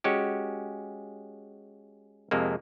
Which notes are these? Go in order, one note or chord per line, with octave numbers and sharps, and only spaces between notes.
G#3 C#4 F#4 G4
F2 C3 G#3 A#3